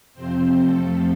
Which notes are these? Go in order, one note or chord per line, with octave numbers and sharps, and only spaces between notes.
F2 C3 F3 C4 C5
A3 A4